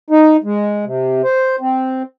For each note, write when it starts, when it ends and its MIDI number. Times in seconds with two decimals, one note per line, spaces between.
0.10 0.37 63
0.44 0.85 56
0.85 1.22 48
1.24 1.56 72
1.61 2.02 60